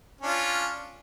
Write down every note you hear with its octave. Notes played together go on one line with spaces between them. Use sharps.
C#4 D4 F4